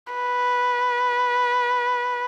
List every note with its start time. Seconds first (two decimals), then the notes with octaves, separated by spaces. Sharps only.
0.13 B4